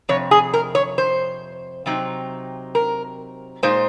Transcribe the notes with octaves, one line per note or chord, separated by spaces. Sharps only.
F2 C3 C#5
G#4
A#4
C#5
C5
C3 F#3 C4 D#4
A#4
A#2 G#3 D#4 C5